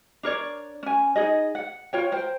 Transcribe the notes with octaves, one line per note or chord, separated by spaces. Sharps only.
D4 A#4 C#5 D5
C#4 G#5
D#4 G#4 D#5
F#5
F4 C#5 G5
A#4 C5 G5